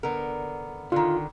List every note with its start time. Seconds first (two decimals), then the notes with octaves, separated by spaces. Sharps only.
0.03 D3 B3 A#4
0.92 D3 D#3 F4